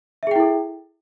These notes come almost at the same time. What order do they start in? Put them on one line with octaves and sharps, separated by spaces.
E5 G#4 G5 E4 A4